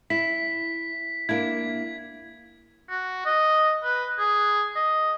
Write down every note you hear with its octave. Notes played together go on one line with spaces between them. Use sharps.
E4 B6
A#3 D4 E4 G#6
F#4
D#5
B4
G#4
D#5